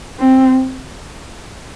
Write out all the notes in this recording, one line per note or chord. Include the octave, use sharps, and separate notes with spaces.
C4